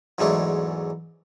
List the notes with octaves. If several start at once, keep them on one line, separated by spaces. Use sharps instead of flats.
E2 G#2 F#3 G#3 A3 D4